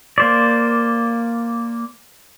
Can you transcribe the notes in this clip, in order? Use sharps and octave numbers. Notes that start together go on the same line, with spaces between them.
A#3 C5 D5